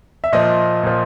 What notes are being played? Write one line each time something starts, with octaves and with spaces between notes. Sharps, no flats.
E5
A#2 F3 D#5
A#2 F3